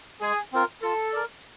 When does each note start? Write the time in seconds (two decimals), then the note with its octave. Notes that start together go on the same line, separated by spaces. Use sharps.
0.21 G#3 G#4
0.52 C4 F4 A#4
0.83 F4 A4
1.13 A#4 D5